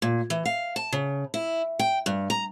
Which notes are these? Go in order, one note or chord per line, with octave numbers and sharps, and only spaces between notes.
A#2
E3
F5
A5
C#3
E4
G5
G2
A#5